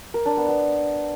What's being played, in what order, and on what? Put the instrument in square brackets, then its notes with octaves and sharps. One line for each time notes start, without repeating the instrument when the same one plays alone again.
[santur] A#4
D4
B3
B3